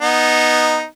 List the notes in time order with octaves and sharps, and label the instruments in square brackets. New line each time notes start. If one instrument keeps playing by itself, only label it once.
[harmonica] B3 D#4